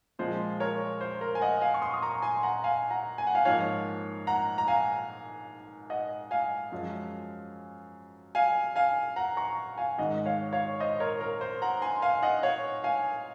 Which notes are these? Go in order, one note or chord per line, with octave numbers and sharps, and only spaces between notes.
A#2 F3 G#3 C5
A#4 C#5
C5
A#4
G#5
D#5 F#5
F5 G#5
C#6
C6 D#6
D#6
A#5 C#6
G#5 C6
F#5 A#5
F5 G#5
F#5 A#5
G#5
F#5
F5 G#5
G#2 F3 A#3 C#5 F5
F#5 A#5
A#5
F5 G#5
D#5 F#5
F5 G#5
F#2 F3 G#3
F5 G#5
F5 G#5
F#5 A#5
A#5 C#6
F5 G#5
G#2 D#3 G#3 D#5 F#5
C#5 F5
C#5 F5
C5 D#5
A#4 C#5
A#4
C5
F#5 A#5
G#5 C6
F5 G#5
D#5 F#5
C#5 F5
F5 G#5